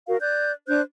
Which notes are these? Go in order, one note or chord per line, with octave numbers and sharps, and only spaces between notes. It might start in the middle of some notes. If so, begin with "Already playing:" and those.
F#4 A#4 F5
D5 F#6 G6
D4 C5 F#6 G6